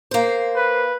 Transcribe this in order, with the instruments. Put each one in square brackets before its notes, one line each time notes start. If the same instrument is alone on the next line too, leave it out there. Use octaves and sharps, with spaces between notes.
[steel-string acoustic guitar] A#3 C5
[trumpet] B4